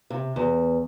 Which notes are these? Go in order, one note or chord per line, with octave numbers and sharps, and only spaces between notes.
C3
E2